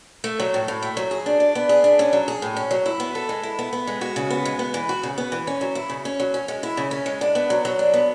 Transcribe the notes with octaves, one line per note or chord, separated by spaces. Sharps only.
A3
F#3
A2
A2
A3
F#3
G#4
D4
D5
B3
G#4
D4
C#4
F#3
G#4
A2
C#4
F#3
E4
B3
A4
G#3
E4
B3
B3
G#3
F#4
C#3
B3
G#3
B3
E3
F#4
C#3
B3
E3
C#4
F#3
E4
C#3
C#4
F#3
C#4
G#3
E4
C#3
C#4
G#3
D4
B3
F#3
F#3
D4
B3